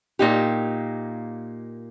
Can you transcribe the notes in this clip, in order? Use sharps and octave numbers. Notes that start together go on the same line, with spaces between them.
A#2 A#3 D#4 G4